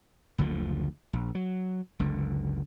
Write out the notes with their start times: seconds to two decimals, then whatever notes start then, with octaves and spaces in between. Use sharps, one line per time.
0.38 F#1 D2 D3 F3
1.13 A#1
1.35 F#3
1.99 F#1 C#2 D3